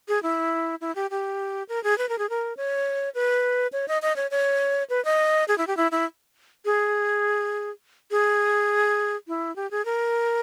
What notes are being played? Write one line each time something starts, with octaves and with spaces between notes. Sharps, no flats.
G#4
E4
E4
G4
G4
A#4
G#4
B4
A#4
G#4
A#4
C#5
B4
C#5
D#5
D#5
C#5
C#5
B4
D#5
G#4
E4
G4
E4
E4
G#4
G#4
E4
G4
G#4
A#4